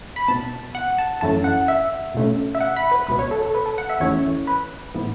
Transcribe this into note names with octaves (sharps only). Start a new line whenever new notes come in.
B5
B2 B3 A5
F#5
A5
F#2 E3 A3 C#4 A5
F#5
E5
B2 A3 C#4
E5
F#5
B5
B4
C#2 B2 B3 B4
C#5
A4
A4
B4
A4
F#5
E5
E2 E3 A3 C#4 C#5
B4
A2 E3 B3